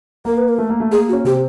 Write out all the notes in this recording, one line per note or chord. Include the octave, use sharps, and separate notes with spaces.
A#3 A#4
B4
A#4
A3
A#3
A3
A#3 G#4
F#4
C#4
C3 C4 G4